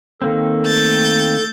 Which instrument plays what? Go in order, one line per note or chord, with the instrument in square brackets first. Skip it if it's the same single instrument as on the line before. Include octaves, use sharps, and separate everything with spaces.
[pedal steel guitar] D#3 A#3 C4 [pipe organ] A4
[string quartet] A3 G6 A6